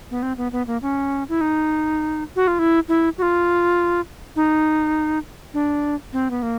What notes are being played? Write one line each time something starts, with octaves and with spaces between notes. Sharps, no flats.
B3
C4
B3
B3
A#3
C#4
E4
D#4
F#4
F4
E4
E4
F#4
F4
D#4
D4
C4
B3
A#3